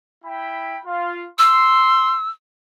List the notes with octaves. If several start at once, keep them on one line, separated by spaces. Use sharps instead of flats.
E4 G5 B5
F4
C6 E6